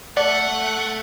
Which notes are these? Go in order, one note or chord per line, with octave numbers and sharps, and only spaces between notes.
A3 A4 D5 F#5